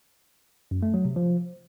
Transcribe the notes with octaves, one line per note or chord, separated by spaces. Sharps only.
F#2
A3
F#3
C3
F3